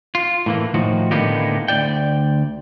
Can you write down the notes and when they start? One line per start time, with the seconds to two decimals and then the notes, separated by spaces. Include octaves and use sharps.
0.15 F4
0.46 A2 E3 A#3
0.74 A2 D#3 F3 F#4
1.11 A2 D3 A#3 B3 D#4 G4
1.68 D2 C#3 D5 G5